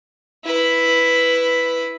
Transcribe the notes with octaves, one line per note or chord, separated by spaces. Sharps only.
E4 B4